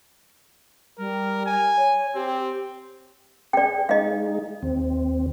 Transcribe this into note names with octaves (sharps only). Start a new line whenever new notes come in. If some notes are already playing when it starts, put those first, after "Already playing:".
G3 A#4
G#5
C#5
C4 G4
G#4 D5 G5
G#3 D#4 D#5 F5
D#2 C4